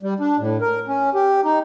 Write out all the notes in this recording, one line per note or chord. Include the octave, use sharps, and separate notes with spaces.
G3
D4
A2
A#4
C#4
G4
D#4